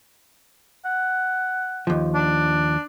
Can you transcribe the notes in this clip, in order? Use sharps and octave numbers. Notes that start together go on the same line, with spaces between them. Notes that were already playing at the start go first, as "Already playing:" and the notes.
F#5
D#2 F3
D4